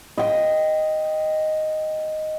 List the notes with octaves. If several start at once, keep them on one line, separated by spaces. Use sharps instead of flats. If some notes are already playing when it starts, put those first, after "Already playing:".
D#5 G5